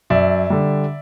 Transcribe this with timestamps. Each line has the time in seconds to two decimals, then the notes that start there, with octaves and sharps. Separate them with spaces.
0.10 F#2 D5 E5
0.50 D3 G3